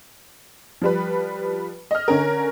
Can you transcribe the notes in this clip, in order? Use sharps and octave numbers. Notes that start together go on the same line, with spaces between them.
F3 G3 B4
D#5 F6
D3 C#4 A#4